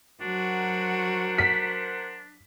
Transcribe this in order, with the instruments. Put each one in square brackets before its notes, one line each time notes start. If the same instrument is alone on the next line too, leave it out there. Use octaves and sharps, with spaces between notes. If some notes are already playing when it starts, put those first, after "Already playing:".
[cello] F#3 F#4 [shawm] D4 [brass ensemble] A#4 C5 F#5
[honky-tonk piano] B6